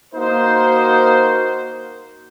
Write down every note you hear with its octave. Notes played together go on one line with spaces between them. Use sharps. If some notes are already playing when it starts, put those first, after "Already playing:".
A#3 D#4 F#4 A#4 C5